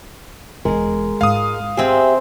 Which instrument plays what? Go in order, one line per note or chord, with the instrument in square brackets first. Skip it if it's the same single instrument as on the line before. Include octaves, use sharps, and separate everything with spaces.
[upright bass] E1 E2 [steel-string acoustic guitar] G#3 A#4
[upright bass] G#2 F4 [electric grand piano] F5 D#6
[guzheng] C4 G#4 [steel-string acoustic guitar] G4 E5